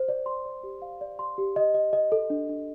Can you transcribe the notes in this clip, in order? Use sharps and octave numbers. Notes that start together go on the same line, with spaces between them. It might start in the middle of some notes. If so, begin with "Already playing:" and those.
Already playing: C5
D5
C6
D5
G4
F5
D5
C6
G4
D#5
D#5
D#5
A4
D4
D4